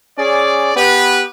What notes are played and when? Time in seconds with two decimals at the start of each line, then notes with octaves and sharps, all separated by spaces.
0.18 C#4 G#4 D5
0.75 B3 G4 B4